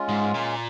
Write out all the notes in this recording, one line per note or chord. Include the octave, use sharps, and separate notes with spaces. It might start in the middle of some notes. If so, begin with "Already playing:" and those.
Already playing: G#3 C#4 F4
G#2
A#2